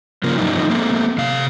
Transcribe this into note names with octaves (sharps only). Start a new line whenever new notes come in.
C#3 F3 A#3
G2 F#3 A#3 D#4 E4
D3 F3 D#4
A3 A#3 C4
C3 F5